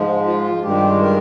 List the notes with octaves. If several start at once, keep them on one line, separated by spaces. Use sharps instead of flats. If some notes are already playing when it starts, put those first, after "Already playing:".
Already playing: G#2 F3 G#3
F4
G2 D#3 G#3 G4
A#4